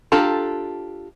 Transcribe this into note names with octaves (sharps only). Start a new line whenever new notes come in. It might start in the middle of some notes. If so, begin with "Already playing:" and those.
D4 F4 G4 A4 A#5